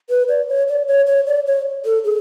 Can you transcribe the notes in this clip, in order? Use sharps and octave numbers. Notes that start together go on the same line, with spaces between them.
B4
D5
C#5
D5
C#5
C#5
D5
C#5
A4
G#4